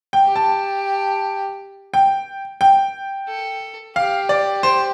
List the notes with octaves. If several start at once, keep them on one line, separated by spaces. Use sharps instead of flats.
G5
G4
A5
G5
G5
A4
G4 F5
D5
C5